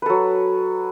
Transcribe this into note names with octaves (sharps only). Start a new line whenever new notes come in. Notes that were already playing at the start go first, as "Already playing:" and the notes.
F#3 A4 B4